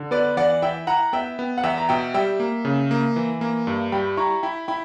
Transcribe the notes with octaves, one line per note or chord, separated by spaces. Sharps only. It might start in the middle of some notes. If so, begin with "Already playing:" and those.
Already playing: D3
B3 B4 D5
E3 D5 F#5
E4 E5 G5
E4 F#5 A#5
B3 E5 G5
B3
F#5
E2 E5 G5
A#5
B2 E5 G5
G3 E5 G5
A#3
C#3
A#3
E3
A#3
G2
G3 G5 B5
E4 A#5 C#6
E4 G5 B5
E4 G5 B5